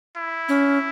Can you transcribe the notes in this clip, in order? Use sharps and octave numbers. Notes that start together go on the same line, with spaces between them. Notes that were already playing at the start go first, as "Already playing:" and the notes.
E4
C#4